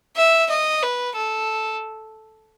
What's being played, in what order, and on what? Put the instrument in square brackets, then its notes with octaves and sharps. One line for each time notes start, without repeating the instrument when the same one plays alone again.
[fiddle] E5
D#5
B4
A4